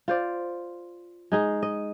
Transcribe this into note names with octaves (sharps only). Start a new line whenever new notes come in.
F4 C5 D5
G#3 D#4 G#4
D#5